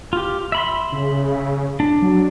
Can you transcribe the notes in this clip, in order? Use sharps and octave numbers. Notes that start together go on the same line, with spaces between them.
F4 G4
E5 B5 C6
C#3
D4
F#3